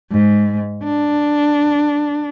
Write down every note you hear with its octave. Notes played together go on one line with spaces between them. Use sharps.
G#2
D4